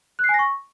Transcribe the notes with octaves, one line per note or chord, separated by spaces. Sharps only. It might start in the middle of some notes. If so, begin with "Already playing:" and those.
F#6
C7
G#5
A#6
C#6